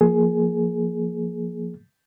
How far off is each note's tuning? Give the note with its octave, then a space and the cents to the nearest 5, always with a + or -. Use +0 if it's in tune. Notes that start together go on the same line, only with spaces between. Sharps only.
F3 +0 A#3 +0 G#4 +20